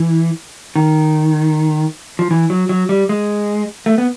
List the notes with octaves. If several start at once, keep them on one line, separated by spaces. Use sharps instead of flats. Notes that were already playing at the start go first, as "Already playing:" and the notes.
Already playing: E3
D#3
F3
E3
F#3
F#3
G3
G#3
A3
B3